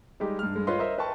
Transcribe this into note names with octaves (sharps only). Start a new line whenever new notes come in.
G3 G#3 D#4 G4
G2 F6
G2 G#3
F4 B4 C#5 D#5 C6
A#4 C5 D#5 E5
B4 G5 A5 C#6